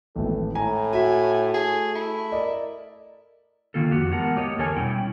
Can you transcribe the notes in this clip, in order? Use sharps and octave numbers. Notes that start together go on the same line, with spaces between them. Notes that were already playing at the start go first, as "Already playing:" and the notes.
G#1 A2 E3 A4
A2 G#5 A#5
F#4 E5 G#5
A3 G#4
E4
A#4 D5 D#5
D3 D#3 A#3 F4 A4
F2 F#4 G4
E3 G#3 B3 A#4 F#5 A5
A#3 G4 C#5 D#5
E2 D3 A4 A#4 C#5 G#5
B2 G3 C#4 E4 G5